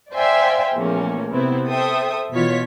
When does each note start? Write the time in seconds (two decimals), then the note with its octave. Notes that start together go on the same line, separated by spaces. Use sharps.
0.14 C5 D5 E5 F5 G5 G#5
0.74 E2 A#2 F3 A3 A#3 C#4
1.32 C3 B3 C4 E4
1.68 A4 C5 E5 G5 D#6
2.32 B2 E3 F4 C#5 B6